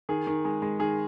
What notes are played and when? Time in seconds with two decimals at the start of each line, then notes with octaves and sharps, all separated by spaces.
0.09 D#3 G#4
0.27 D#3
0.45 G#3
0.62 G#3
0.79 D#3 G#4